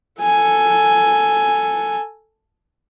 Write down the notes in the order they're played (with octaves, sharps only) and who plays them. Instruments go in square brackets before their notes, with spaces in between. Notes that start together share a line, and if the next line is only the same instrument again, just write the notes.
[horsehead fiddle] A4 G#5